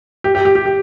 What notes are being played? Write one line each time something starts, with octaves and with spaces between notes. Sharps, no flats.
G4
G4
G4
G4
G4